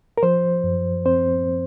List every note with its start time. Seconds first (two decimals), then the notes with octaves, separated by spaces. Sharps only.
0.18 A#4
0.23 F3 C5
0.64 F#2
1.05 C4 C5